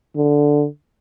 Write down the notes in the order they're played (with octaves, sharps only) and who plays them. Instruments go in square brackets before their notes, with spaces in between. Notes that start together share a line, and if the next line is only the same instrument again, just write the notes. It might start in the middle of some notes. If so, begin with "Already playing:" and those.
[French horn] D3